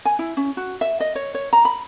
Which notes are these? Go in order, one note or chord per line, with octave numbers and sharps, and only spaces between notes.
G#5
E4
C#4
F#4
E5
D#5
C#5
C#5
A#5
B5